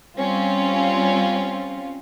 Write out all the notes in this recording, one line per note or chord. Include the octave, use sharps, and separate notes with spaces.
G3 C4 C#4 F4